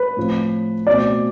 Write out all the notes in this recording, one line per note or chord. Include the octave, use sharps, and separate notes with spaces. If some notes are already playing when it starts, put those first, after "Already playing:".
Already playing: B4
A2 F3 C4
B2 A3 C4 D5